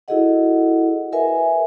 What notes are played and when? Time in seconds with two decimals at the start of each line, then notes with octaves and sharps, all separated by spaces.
0.08 E4 F#4 G#4 A4 D#5 F#5
1.12 G#4 A#4 B4 E5 G#5